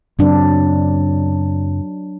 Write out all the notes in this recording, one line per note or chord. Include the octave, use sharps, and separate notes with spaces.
F#2 C#3 F#3 C4 D4